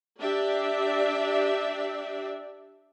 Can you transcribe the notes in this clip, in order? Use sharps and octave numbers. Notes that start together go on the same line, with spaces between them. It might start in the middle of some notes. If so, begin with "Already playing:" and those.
D4 G4 D5 E5